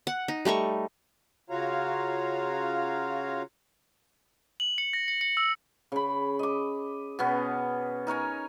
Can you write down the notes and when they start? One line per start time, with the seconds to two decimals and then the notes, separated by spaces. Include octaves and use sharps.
0.07 F#5
0.28 D#4
0.45 G3 A3 D#4 C#6
1.50 C#3 F4 F#4 C#5 F5 A#5
4.60 F#7
4.78 C#7
4.93 A#6
5.08 C#7
5.21 C#7
5.37 E6
5.92 C#3 B5
6.39 D#5 D6
7.19 B2 B3 C#4
8.07 D#4 A#4 C#5 G#5